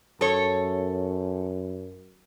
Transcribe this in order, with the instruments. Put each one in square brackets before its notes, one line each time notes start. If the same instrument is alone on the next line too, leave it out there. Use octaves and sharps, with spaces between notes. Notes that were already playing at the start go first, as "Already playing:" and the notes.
[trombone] F#2 [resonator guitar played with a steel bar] A4 C#5